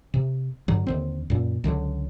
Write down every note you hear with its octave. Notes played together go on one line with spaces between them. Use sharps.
C3
G2 D3 F#3
D#2 D3 C4
F#2 A#2
C#2 D3 D#3 F#3